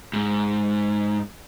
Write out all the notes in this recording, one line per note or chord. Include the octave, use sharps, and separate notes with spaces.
G#2